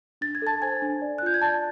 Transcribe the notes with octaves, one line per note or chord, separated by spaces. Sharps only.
D4 A6
G#6
A4 A5 A6
C5 G#5 G#6
D4
D5
F#6
F4 G6
G#6
D5 A5 A6